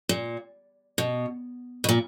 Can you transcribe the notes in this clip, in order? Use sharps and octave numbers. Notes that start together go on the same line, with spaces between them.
A#2
B2
B2
A#2